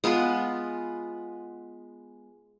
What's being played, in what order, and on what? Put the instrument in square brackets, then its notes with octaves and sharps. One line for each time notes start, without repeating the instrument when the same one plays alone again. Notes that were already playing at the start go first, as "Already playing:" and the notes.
[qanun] G#3 B3 F4 B4